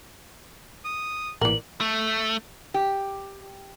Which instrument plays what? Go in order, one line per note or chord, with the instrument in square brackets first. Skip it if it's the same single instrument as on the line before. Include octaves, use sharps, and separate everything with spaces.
[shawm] D#6
[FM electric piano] A1 A#2 E3 [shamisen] A#4 D5 [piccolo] F#7
[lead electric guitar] A3
[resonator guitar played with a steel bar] G4